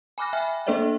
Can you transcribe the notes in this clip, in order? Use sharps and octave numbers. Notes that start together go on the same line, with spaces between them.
G#5 B5 D6 F6 F#6 A#6
E5 G5 G#5 B5 F6
A#3 D4 A4 C5 D5 E5